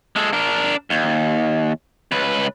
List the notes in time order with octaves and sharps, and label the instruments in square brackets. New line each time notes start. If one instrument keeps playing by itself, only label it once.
[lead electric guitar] G#3 A4
D4 A#4
D#2
C#2 B4